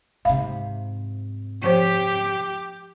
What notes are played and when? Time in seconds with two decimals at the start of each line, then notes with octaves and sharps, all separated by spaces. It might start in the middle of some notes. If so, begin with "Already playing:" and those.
0.25 G#2 C3 E5 F5 B5
1.64 F3 G4 C5